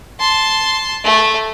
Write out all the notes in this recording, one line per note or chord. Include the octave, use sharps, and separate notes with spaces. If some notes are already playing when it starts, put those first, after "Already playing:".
A5 C6
A3